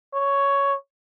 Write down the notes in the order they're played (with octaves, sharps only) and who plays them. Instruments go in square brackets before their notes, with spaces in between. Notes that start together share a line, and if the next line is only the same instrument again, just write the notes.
[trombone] C#5